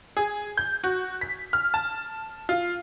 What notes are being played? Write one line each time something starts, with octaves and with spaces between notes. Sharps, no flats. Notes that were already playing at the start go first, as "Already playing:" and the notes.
G#4
G6
F#4
B6
F6
A5
F4